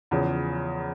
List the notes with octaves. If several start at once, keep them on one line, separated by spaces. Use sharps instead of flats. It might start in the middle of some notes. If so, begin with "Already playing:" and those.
E2 C#3 F3